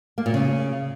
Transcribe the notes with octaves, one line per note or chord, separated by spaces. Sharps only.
A#3
A#2
C#3